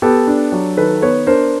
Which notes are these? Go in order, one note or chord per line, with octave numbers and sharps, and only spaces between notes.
B3 G4 A4
D4
F#3
D#3 A4 B4
B3 B4 C#5
D4 A#4 C5